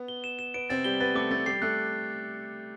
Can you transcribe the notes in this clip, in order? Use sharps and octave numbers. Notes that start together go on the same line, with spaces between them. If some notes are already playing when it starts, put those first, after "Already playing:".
Already playing: B3
G7
E7
E7
B3 D7
C3 C4 A6
G3 G4 G7
B3 B4 A6
A3 A4 D6
A3 A4 A6
G3 G4 C7
A3 A4 F#6